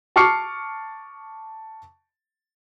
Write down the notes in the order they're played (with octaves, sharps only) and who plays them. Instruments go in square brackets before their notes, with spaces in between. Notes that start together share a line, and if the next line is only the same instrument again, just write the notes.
[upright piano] A5 C#6 D6 F6 C7 C#7